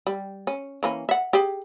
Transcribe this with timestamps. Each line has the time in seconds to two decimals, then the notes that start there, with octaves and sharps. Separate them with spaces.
0.07 G3
0.47 C#4
0.83 E3 A#3 C#4
1.09 E5 F#5
1.33 G4 G#4